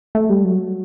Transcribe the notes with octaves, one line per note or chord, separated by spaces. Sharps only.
A3
G3
F#3